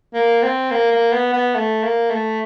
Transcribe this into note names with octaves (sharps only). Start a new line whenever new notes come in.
A#3
C4
A#3
A#3
B3
B3
A3
A#3
A3